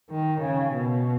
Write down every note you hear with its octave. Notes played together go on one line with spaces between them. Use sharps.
D#3
C#3
B2